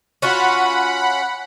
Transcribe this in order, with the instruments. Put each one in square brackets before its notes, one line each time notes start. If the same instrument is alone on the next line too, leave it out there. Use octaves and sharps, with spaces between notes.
[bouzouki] C#4 F4 F#4 [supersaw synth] F#5 B5